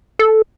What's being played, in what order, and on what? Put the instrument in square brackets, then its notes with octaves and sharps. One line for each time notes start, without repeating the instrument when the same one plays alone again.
[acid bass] A4